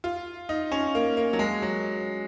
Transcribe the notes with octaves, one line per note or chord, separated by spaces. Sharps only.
F4
D#4
C#4
A#3
A#3
F#3
G#3
F#3